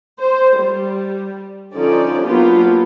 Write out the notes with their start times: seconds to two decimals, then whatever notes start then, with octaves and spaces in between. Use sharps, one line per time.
0.21 C5
0.58 G3
1.75 D3 F3 C#4 D#4 D5
2.25 F#3 A#3 B3 D4 F4 G4